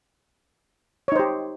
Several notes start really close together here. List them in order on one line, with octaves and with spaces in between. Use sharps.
C#5 D#4 C5 G4